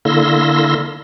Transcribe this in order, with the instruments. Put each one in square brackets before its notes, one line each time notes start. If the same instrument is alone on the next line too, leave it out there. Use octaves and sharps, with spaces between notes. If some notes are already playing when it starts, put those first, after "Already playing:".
[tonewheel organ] D3 A#3 E4 C6 E6 A#6